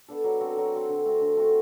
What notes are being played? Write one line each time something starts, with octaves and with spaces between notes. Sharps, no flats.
B3 D4 A4
F#3
C4 F#4 A4
F#3
C4 F#4 A4
D3
A3 C4 F#4
D3
A3 C4 F#4